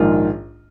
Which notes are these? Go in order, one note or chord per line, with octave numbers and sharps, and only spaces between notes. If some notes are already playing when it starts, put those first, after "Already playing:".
Already playing: A#1 G#2 D#3 A#3 F4